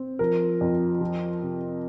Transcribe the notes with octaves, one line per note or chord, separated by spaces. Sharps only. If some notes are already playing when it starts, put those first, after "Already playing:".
Already playing: C4
F3 A#4
F2
F3
C3